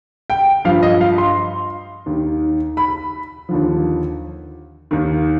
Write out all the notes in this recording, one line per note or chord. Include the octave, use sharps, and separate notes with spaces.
G5
G2 F3 F5
D#5
F5
C6
D#2 D#3
B5
D#2 D3 F3
D#2 D#3